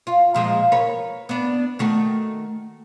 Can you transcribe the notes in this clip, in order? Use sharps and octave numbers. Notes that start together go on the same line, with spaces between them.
F4
A#2 F3 G#3
A#4 B4 C#5
B3 D4
D#3 A3 F#4